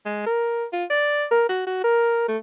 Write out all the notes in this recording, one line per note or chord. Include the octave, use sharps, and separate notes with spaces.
G#3
A#4
F4
D5
A#4
F#4
F#4
A#4
A3